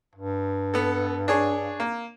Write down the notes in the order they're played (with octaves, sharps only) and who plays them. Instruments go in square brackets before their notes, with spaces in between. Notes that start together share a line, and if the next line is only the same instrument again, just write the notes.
[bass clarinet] G2
[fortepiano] B3 A4
D4 G#4 C#5
A#3